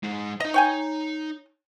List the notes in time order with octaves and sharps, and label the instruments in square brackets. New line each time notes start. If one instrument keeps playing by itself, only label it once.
[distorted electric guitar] G#3 D#4
[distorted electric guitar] D#4 A#5 [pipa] D#5
[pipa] C#5 G5 G#5